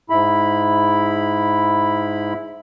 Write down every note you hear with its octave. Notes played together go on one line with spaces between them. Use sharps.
G#2 E4 B5